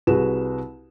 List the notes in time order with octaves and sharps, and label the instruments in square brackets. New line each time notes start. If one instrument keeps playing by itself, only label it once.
[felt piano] C2 F#4 G#4 B4 E7